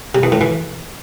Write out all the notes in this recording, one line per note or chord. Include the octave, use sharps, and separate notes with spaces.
C3
E2
A2
E3